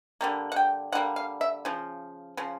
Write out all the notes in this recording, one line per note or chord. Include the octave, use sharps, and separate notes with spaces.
D3 G3 A#3
F#5
G5
D3 G3 A#3 F#5
F5
E5
C#3 F3
C#3 F3